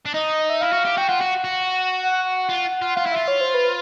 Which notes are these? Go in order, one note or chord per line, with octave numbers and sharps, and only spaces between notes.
D4
D#4 D#5
E5
E4 F5
F#4
G4
F#4 G5
F4 F#5
F#4
F#4
F#5
F4
F4
F4 F5
E4
F4 E5
C#5
C5
B4